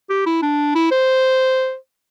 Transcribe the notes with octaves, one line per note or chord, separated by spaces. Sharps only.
G4
E4
D4
E4
C5